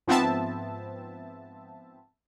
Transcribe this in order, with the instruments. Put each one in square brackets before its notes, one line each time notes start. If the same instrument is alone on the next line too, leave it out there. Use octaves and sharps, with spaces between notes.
[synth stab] G#2 F3 B3 C4 E5 A5